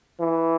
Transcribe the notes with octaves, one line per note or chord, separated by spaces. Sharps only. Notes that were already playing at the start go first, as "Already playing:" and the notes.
E3